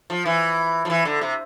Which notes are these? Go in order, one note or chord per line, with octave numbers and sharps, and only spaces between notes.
F3
E3
F3
E3
D3
C3